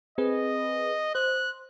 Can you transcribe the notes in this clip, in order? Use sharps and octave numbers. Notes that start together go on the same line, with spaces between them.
C4 G#4 B4 D#5
C5 F#6